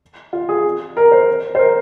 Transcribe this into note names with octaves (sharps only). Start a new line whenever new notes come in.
F4
G#4
A#4
C5
C5
A#4